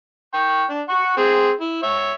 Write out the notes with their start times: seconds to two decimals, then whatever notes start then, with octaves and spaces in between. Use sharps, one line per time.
0.34 G5 C#6
0.70 D4
0.89 F#5 C#6
1.17 C4 G#4
1.61 E4
1.83 C#5 E5